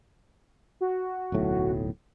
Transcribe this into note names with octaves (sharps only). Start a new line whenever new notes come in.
F#4
D1 B1 A2